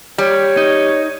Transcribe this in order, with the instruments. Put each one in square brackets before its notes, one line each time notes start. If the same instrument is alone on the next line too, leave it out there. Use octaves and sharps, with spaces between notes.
[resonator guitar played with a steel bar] G3 [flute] C#5
[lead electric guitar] D#4